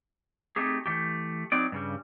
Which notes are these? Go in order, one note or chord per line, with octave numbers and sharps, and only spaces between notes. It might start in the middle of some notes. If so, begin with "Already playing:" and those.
A3 C4 D#4 G4 G#4
E3 G3 A3 G4
F#3 C4 D#4 D5
G2 C#3 G3